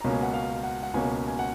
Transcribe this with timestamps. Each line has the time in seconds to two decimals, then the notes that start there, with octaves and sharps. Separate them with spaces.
0.01 C#2 B2 A#3 C#4 A#5
0.11 G#5
0.22 F#5
0.33 F5
0.63 F#5
0.83 F#5
0.94 C#2 B2 A#3 C#4 G#5
1.28 G#5
1.39 F#5